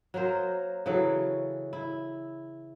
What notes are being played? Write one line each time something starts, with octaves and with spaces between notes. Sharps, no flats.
F#3 A#3 A#4 C5
C#3 E3 F#3 A4
E4